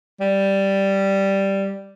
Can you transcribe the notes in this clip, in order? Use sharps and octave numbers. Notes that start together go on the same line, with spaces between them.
G3